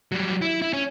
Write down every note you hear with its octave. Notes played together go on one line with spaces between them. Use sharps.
F#3 G3
E4
E4
C#4